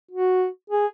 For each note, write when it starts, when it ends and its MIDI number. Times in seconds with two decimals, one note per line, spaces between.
0.11 0.46 66
0.70 0.86 68